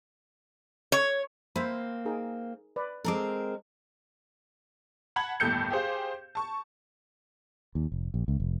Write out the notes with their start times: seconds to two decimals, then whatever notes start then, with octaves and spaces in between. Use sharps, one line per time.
0.92 C#5
1.56 A#3 C4 C5 E5 B5
2.05 D#4 G#4 A#4
2.76 B4 D5
3.04 G#3 C4 A4 A#4 D6
5.16 F#5 A5 B5 G#6 F#7
5.40 G1 D#2 A2 A4 G6 C#7
5.70 G4 G#4 C5 F5
6.35 A5 C#6
7.75 D#2
7.92 F1
8.14 A#1
8.28 C#2
8.40 F1